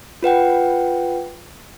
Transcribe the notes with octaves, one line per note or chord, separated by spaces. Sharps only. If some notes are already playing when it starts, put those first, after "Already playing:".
F4 B4 F#5 G5